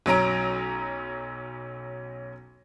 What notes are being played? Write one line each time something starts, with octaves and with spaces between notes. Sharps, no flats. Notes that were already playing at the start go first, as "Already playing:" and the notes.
B1 F#3 C#4 A#5 D7